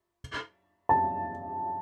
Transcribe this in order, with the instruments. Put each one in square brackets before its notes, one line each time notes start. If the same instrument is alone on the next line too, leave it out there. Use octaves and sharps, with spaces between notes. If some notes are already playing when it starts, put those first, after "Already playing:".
[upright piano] A5